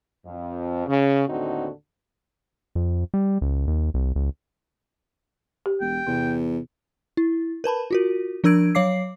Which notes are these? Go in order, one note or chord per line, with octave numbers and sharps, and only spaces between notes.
F2
C#3
D#2 A2 D3 C4 D#4 F#4
F2
G3
C#2
D#2
C2
C#2
G4
E1 G5
E2 C3
E4
A#4 B4 A5 B5
F4 F#4 A#4
F3 D4 A#4 E6 G#6 D7
F#3 C#5 F5 D6 C7